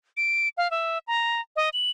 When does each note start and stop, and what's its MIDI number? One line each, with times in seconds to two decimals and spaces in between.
0.17 0.49 98
0.58 0.70 77
0.71 0.98 76
1.08 1.41 82
1.56 1.69 75
1.73 1.90 102